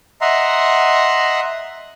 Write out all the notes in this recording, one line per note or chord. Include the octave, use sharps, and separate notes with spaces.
D#5 E5 F#5 A#5 C6